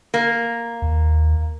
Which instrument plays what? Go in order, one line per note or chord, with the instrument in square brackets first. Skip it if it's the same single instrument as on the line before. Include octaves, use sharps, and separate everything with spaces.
[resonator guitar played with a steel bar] A#3
[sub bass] D#2